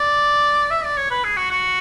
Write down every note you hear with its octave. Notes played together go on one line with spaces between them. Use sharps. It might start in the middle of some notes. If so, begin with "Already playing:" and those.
Already playing: D5
E5
D5
C#5
B4
G#4
F#4
F#4